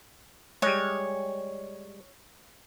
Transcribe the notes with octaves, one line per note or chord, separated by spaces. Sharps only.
G3 G#3 C#5